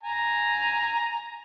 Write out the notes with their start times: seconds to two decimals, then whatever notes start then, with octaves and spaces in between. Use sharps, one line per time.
0.04 G#5 A#5